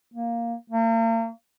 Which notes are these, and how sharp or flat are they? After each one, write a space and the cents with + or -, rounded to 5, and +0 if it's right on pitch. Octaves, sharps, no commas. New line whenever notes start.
A#3 +0
A#3 -40